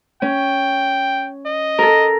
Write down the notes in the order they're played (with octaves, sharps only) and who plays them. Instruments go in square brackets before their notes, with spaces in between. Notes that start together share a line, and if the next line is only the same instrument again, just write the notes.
[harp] C#4 [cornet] G5
[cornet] D#5
[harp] A4 A#4